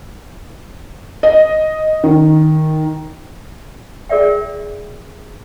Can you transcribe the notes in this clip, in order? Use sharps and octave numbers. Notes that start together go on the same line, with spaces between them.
D#5
D#3
G#4 A#4 D5 E5 G5